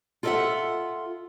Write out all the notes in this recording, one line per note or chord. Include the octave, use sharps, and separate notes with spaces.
F4 A4 A#4 D5 E5 F#5